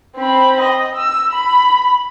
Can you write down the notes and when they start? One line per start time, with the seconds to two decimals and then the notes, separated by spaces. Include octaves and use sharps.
0.16 C4 B5
0.61 D#5
0.95 E6
1.31 B5